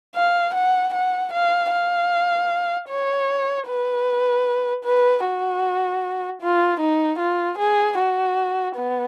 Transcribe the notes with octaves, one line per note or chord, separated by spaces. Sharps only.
F5
F#5
F#5
F5
F5
C#5
B4
B4
F#4
F4
D#4
F4
G#4
F#4
B3